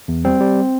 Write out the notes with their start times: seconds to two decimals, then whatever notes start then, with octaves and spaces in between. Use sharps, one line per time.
0.08 E2
0.25 G3 C4
0.40 G3